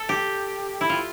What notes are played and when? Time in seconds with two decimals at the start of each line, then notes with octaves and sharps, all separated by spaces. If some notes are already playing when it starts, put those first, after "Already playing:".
Already playing: A4
0.09 G4
0.81 E4
0.89 F4